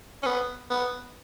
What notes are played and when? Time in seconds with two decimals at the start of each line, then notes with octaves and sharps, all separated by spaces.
0.22 C#4
0.26 B3
0.70 B3